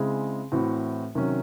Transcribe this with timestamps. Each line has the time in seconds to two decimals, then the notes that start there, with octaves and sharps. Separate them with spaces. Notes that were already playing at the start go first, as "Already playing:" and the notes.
Already playing: C#3 G#3 C4 E4 G#4
0.52 A2 E3 C4 F#4
1.15 C3 D#3 F#3 C#4